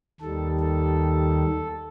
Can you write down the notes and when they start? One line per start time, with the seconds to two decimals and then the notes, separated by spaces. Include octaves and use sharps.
0.21 D#2 D#3 G3 A4
0.60 A4